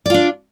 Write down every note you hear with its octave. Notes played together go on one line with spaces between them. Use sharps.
D4 F4 D5